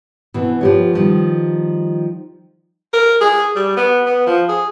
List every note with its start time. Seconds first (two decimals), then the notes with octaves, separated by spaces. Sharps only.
0.34 B2 E3 C4
0.61 F3 G4 C#5
0.94 D#3 F3 G3
2.94 A#4
3.21 G#4
3.56 G3
3.77 B3
4.06 B3
4.26 F3
4.49 G#4